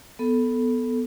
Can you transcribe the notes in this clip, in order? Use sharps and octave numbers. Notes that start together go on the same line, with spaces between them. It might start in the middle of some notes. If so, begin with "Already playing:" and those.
B3 A4